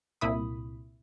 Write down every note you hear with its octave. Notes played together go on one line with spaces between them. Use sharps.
C2 A#2 E4 B5 D#6